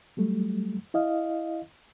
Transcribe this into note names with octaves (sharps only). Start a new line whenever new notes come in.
F#3 G3 A3
E4 D#5 F5